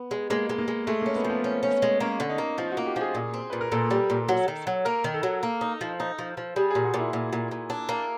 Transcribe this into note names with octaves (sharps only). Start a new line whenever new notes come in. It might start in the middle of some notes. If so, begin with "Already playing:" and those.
Already playing: B3
G#3
G#3 A#3
G#3
A#3
G#3
G#3 A3
A#3 C#4
B3
F3
B3
C#4
C#4
G#3
A#3 C#4
D3
D#4
A#3
F3 F4
F#4
A#3
G4
F3 G#4
A#2
C4
A#2 B4
A#4
A#2 A4
G3
A#2
F#3
D#3
F#3
A#3 A#4
D#3
A4
F#3
A#3
D#4
F3
D#4
F3
F3
G3 G#4
A#2 G#4
F#4
A#2 E4
A#2
A#2
A#2
D4
A#3